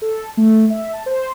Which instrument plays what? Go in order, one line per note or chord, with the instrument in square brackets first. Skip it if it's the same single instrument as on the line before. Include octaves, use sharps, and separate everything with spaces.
[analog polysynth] A4
A3
E5
A5
C5